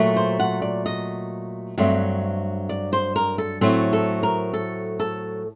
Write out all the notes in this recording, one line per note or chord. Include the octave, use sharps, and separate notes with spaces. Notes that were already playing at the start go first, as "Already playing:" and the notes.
Already playing: A#2 F#3 A3
C5
F#5
D5
D#5
G2 F#3 A3 C4
D5
C5
A#4
A4
A2 F#3 A3 C4 A4
A4
A#4
A4
A4